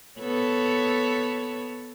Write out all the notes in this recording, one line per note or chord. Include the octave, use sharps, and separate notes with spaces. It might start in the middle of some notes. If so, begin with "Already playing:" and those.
B3 A4 C#5